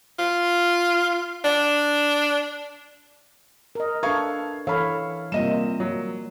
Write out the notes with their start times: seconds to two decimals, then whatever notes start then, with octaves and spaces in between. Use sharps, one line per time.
0.19 F4
1.45 D4
3.75 A#4 D#5
4.03 D4 A4 B4 F5 C#6 G#6
4.67 E3 A4 C#5 F5 B5
5.32 C3 G3 A#3 F4 D#5 E7
5.80 F#3